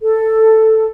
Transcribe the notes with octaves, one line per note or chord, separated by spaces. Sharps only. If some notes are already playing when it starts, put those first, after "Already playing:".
A4